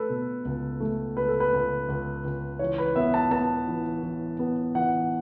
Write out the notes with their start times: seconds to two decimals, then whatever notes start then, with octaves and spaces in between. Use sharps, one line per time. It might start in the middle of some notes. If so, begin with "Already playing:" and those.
Already playing: A3 A4 B4
0.10 B2
0.45 C#2
0.80 A3
1.17 C#2 B4
1.29 A4
1.40 B4
1.52 C#2
1.88 C#2
2.24 C#2
2.59 E3 C#5
2.78 B4
2.96 B3 E5
3.14 A5
3.31 B3 A5
3.68 E3
4.03 E3
4.39 B3
4.75 E3 F#5